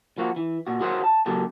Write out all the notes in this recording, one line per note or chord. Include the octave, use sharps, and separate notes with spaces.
F3 A#3 F#4
E3
A#2 F#4
F#4 G#4 A#4 C5 C#5 F#5
A5
C#3 F#3 A#3 F#4 G4 A4